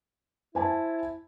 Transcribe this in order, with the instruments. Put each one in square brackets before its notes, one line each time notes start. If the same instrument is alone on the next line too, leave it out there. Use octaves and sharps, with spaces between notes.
[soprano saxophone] E4 [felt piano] C5 G#5 A5